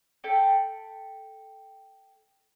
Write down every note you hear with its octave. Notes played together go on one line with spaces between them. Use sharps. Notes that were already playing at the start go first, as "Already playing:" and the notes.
A4 G5 B5